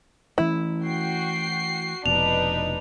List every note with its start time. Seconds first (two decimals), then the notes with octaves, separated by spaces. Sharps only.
0.38 E3 A3 C#4 E4
0.82 F#4 G5 C7
2.06 F1 F2 B2 D4 D#4 B4 F7